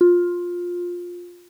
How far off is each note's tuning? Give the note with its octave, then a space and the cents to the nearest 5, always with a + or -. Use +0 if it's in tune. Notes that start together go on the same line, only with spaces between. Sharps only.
F4 +15